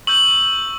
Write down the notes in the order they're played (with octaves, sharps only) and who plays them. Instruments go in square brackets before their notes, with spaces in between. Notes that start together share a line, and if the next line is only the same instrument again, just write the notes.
[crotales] C#6 E6 G6 F#7